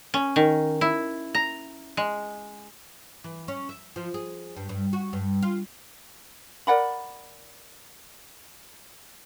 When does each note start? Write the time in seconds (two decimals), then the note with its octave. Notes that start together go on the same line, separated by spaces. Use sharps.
0.14 C#4
0.36 D#3
0.81 E4
1.35 A#5
1.97 G#3
3.24 E3
3.48 C#4
3.69 E5
3.96 F3
4.14 G#4
4.57 G2
4.69 G2
4.93 F#4
5.13 G2
5.42 F4
6.67 A#4 D5 F#5 B5